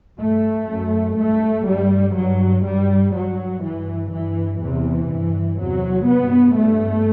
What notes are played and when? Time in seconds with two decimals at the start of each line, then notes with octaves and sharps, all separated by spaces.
0.19 G2 A3
0.68 F#2
1.17 G2 A3
1.65 G2 G3
2.15 G2 F#3
2.64 G2 G3
3.13 G2 F#3
3.62 G2 E3
4.11 G2 E3
4.60 E2 C3 E3
5.09 G2
5.58 E2 C3 F#3
6.08 G2 B3
6.56 G2 A3